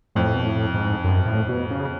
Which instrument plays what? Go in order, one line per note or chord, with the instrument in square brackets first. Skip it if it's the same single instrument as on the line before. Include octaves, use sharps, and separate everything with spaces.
[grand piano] F2 [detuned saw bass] A2
[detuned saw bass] B2
A2
G#2
F#2
A2
B2
C#3